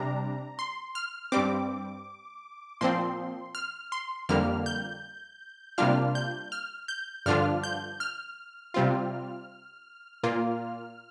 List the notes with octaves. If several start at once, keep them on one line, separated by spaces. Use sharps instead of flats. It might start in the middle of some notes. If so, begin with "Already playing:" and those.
Already playing: C3 G3 D4 A#5
C6
F6
G2 G3 C4 D6
A#2 F3 C4 C6
F6
C6
F2 D3 G3 A#3 F6
G6
C3 G3 A#3 D4 F4 F6
G6
F6
G6
G2 D3 F3 D4 F4 F6
G6
F6
C3 G3 C4 F4
A#2 A#3 F4